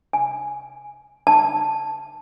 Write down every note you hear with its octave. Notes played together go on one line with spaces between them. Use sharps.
G#5
A5